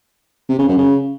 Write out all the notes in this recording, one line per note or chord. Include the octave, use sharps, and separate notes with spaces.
C3
C#3
F#2
C#3